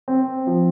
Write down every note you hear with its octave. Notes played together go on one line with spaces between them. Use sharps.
C4
F3